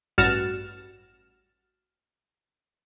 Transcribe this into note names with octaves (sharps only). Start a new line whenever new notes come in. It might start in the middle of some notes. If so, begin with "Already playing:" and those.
A1 G2 F#4 F6 A6 E7